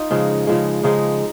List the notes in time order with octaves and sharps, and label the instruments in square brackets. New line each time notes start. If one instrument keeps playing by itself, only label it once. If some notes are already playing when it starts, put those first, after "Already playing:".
Already playing: [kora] D#4 F4
C#3 F3 G#3
C#3 F3 G#3
C#3 F3 G#3 D#4